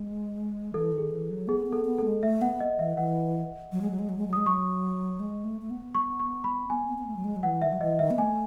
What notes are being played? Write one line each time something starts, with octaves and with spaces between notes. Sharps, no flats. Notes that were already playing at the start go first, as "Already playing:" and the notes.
Already playing: G#3
E3 A4
D#3
G#4
E3
F#3
B3 G#4
B3
A4
B3
A4
G#3
A3 E5
B3 F#5
D#5
E3 E5
E3 F#5
F#3
G#3
F#3
G#3
F#3
G#3
F#3
G#3 D#6
F#3 C#6
G#3
A3
A3
B3
C#6
C#6
B5
B3 G#5
B3
B3
A3
F#3
G#3
F#3
E3 F#5
D#3 E5
F#3
E3 D#5
D#3 E5
B3
A3 G#5